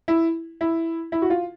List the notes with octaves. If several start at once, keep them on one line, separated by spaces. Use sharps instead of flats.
E4
E4
E4
F#4
F4